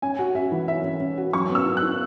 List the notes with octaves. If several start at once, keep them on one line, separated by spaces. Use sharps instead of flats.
C#4 G#5
F#4
F#4 E5
E3
C#4 E5
C#4
C#4
F#4
F#3 C#6
B3
E6
E4
F#6
E4